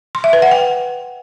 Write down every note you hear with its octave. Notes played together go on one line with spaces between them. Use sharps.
C6
E5
B4
F#5
G5